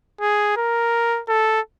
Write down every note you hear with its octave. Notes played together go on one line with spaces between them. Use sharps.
G#4
A#4
A4